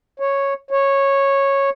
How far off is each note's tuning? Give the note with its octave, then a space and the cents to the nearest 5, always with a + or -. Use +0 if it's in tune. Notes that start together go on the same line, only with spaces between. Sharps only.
C#5 -5
C#5 -10